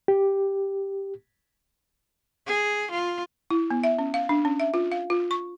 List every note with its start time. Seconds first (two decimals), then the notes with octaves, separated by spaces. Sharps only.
0.08 G4
2.47 G#4
2.91 F4
3.50 E4
3.70 B3
3.83 E5
3.99 C#4
4.14 F5
4.29 D4
4.45 C#4
4.60 E5
4.74 F4
4.92 F5
5.10 F4
5.31 C#6